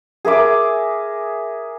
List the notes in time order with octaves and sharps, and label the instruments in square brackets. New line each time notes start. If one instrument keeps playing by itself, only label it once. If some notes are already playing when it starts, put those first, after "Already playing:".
[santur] G#4 A#4 E5 D6